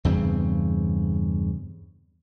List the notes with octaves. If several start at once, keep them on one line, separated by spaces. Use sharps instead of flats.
E2 G2 C#3 C4